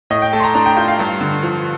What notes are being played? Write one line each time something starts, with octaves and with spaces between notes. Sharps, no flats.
A2 D#5
G5
A3 A5
C6
A#5
D4 A#5
G5
F4 G5
F5
G2
D3
F3